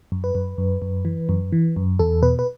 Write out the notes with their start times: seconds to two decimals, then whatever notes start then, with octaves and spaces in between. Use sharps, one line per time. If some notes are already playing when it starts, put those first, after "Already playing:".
0.12 F#2
0.24 B4
0.35 F#2
0.58 F#2
0.82 F#2
1.05 E3
1.29 F#2
1.52 E3
1.76 F#2
1.99 E2 A4
2.22 B2 B4
2.39 B4